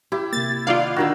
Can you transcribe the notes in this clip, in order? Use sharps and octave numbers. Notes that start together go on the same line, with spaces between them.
E4 G4
C3 A#3 A6
D#3 D#4 F4 D5 F5 F#5
D3 D#3 F#4 A#4 E6